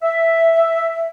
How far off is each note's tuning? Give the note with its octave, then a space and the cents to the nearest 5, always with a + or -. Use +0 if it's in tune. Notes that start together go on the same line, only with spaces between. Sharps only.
E5 +0